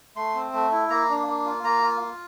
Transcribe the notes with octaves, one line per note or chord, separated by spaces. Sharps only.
A3 C6
C4
A3
E4
A#3 A#5
D4
A#3
F4
A#3 A#5
F4
F4